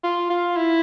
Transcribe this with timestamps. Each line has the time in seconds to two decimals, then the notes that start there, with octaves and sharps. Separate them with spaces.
0.04 F4
0.30 F4
0.57 E4